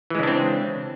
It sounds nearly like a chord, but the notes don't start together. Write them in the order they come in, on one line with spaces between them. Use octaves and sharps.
E3 G#3 C#3 D4 C4